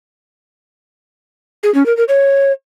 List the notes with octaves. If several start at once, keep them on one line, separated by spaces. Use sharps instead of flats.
G#4
C#4
A#4
A#4
C#5